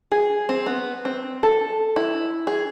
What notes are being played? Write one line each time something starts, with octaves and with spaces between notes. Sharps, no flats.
G#4
C4
B3
C4
A4
E4
G#4